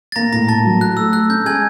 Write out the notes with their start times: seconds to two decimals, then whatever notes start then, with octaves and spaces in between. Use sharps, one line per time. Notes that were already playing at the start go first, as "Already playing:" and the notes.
0.12 A6
0.16 A#3 A#5 A#6
0.32 A2 A#5 A#6
0.48 A2 A5 A6
0.64 F#3
0.81 F#4 F#6
0.97 A3 E6
1.13 A3 F#6
1.29 C#4 G6
1.45 G#3 G#5 G#6